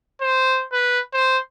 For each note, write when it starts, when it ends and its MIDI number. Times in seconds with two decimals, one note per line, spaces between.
0.21 0.64 72
0.73 1.00 71
1.13 1.38 72